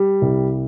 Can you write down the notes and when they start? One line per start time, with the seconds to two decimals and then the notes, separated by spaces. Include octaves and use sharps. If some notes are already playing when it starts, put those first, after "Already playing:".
Already playing: G3
0.21 C2